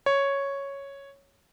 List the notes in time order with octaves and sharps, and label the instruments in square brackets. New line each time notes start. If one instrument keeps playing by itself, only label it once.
[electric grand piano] C#5